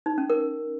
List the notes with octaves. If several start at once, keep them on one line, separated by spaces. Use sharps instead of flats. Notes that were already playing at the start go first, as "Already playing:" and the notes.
D#4
C#4
A#4